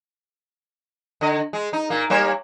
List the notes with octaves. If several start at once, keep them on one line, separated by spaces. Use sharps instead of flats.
D3 D#5
G#3
D#4
A#2 A#3
G3 A#3 C#5